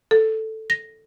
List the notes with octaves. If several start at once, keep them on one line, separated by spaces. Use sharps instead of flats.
A4
A#6